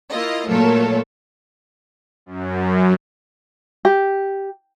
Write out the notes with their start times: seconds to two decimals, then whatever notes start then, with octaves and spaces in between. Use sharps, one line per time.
0.11 A#3 E4 F4 D#5
0.48 A#2 F#3 A3 A4 A#4 C#5
2.26 F#2
3.85 G4